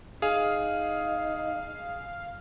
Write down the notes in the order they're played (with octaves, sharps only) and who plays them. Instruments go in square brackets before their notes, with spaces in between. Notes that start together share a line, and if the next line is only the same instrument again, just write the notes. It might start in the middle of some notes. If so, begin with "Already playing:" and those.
[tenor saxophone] D#4 [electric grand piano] G#4 [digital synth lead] F5